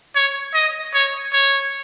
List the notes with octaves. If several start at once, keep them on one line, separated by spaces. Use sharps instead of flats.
C#5
D#5
C#5
C#5